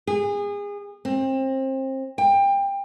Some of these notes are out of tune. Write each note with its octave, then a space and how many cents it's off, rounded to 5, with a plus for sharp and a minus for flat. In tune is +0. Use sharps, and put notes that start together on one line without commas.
G#4 -30
C4 +30
G5 +25